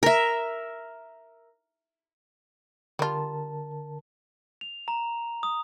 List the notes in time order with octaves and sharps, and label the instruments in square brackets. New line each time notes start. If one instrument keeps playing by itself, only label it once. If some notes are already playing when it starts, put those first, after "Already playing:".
[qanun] A#4 E5
[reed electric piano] D3 A#4 A5 [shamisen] G3 F4
[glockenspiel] F7
A#5
D#6